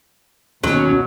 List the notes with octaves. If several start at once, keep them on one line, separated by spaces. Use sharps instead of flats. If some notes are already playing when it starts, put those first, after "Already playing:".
D#2 B2 F#3 C#4